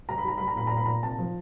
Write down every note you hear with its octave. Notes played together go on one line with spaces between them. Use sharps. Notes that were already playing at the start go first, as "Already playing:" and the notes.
G3 A#5
B5
G3 A#5
G3 B5
A#5
A#2 B5
A#2 A#5
B5
A#2 A#5
C3 A5
F3